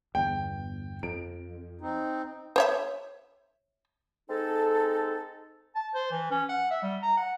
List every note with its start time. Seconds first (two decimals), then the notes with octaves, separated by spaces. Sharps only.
0.15 G1 E2 G5
1.03 F2 D7
1.81 C4 D#4
2.56 C5 C#5 E5
4.29 G#3 C4 D#4 A4
5.75 A5
5.95 C5
6.11 E3
6.31 C#4
6.49 F#5
6.70 E5
6.83 G3
7.03 A#5
7.17 F#5